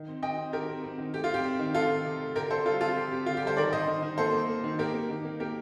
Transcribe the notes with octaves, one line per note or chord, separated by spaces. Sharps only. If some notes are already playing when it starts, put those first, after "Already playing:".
Already playing: D#3
C4
D#3 D#5 G5
C4
D#3 G4 A#4
C4
C4
D#3
A3 G4
F4
C4 G4
C4
D#3
A3 F4 A4
D#3
C3
A3
D3 G4 A#4
D3 A4 C5
G3 F4 A4
C4 F4 A4
C4 G4
C4 G4
D3 F4
G4
G3 A4 C5
D#3 A#4 D5
D#3 C5 D#5
D#3
D#3
A#3 A4 C5
A#3
A#3
D#3
A#3 G4 A#4
A#3
D#3
A#3
A#3 G4 A#4